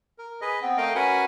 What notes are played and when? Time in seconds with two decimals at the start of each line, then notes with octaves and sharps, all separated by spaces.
0.18 A#4
0.41 G#4 B4 D#5
0.62 B3 C4
0.77 A3 A#4 D#5 F5 G5
0.95 C#4 F#4 A#4 B4 F#5 G#5